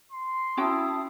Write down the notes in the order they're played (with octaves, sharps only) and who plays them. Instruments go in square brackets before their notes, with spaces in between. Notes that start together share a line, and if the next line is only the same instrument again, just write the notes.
[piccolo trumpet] C6
[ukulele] C#4 F#4 G5 [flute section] E4 A5 D#6